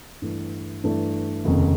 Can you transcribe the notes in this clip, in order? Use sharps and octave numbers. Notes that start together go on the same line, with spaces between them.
G2 E3 A3
G2 E3 A3
F1 D#2 C#3